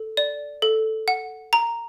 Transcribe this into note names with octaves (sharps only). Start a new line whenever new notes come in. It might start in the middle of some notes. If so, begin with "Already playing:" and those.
Already playing: A4
D5
A4
F#5
A#5